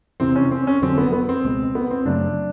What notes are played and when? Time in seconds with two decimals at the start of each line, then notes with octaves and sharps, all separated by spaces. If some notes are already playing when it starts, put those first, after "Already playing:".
0.20 E2 C3 E3 C4
0.36 C#4
0.51 C4
0.67 C#4
0.82 F1 F2 D3 F#3 C4
0.98 B3
1.12 B3
1.29 C4
1.44 C#2 B2 G#3
1.75 B3
1.91 C4
2.05 F#2 C#3 F#3 A3 D4